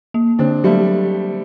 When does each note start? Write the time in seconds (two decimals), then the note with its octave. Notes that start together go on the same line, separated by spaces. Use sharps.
0.14 A#3
0.39 D3 C4 D4
0.64 F#3 G3 A3